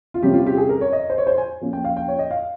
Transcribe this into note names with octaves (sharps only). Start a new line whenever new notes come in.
F4
C3 G3 C#4 G4
F4
G4
G#4
A#4
C#5
D#5
C5
C#5
C5
G#5
F3 A#3 C#4
G5
F5
G5
C#5
D#5
F5